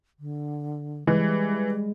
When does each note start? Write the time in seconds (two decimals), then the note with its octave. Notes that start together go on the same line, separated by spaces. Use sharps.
0.20 D3
1.07 E3 G3 G#3